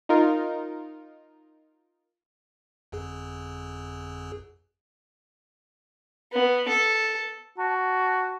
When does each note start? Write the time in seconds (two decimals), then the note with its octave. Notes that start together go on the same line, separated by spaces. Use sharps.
0.09 D#4 F4 A#4
2.92 G1 F2 G#4
6.33 B3
6.69 A4
7.58 F#4 A5